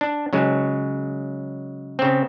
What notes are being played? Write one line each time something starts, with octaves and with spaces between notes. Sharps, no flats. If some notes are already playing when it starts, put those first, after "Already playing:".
D4
C#3 F#3 G#3
C#3 C4